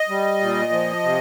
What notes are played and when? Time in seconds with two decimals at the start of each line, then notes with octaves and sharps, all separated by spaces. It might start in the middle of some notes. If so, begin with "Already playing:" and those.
Already playing: D#5
0.09 G3
0.41 A#2
0.72 F3
1.04 C3